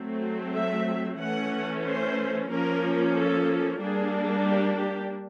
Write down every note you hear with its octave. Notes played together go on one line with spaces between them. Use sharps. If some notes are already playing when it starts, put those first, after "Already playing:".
Already playing: F#3 A3 C4
E5
E3 A3 C#4 F#5
C5
F3 A#3 C#4 A#4
A4
G3 A#3 D4 G#4
G4
G4